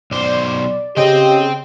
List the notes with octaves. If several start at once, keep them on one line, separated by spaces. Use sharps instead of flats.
B1 C5 D5
C#3 G4 C5 D#5 G5